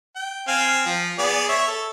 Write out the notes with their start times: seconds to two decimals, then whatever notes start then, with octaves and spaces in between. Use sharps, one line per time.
0.16 G5
0.48 C4 F5 G#5
0.86 F3
1.18 B3 G#4 D5
1.49 C#5 E5
1.68 A4